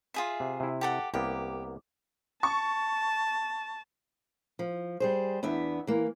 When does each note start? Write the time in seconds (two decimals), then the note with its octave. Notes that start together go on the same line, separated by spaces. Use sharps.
0.14 F4 G#4 E5
0.40 C3
0.60 C3 E4
0.81 G4 A4 F#5
1.14 C2 A#3 B3 G4
2.43 A5 C#6
4.59 F3
5.00 G3 G#4 C5
5.43 E2 B3 D4 E5
5.87 E3 A#3